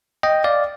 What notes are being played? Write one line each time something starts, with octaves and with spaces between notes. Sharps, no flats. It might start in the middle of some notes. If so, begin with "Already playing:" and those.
D#5 G5
D5 F5